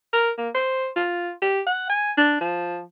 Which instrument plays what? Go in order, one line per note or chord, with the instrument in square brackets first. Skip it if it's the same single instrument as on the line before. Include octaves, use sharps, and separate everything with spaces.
[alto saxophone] A#4
A#3
C5
F4
G4
F#5
G#5
D4
F3